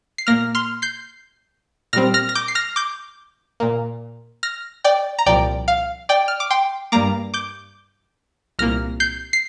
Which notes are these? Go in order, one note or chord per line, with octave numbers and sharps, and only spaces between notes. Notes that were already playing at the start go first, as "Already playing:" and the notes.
C7
A#2 A#3 F6 A#6
C6 F6
G6 C7
A#2 G3 C4 F6 A#6
F6 A#6
A#6
D6 G6
C7
F6 A#6
D6 G6
A#2 A#3
F6 A#6
D5 G5
A#5
C2 A#2 F3 D5 G5
F5
D5 G5
F6
D6
G5 C6
G2 G3 A#3 A#5 D6
D6 G6
C2 A#2 A#3 F6 A#6
G6 C7
C7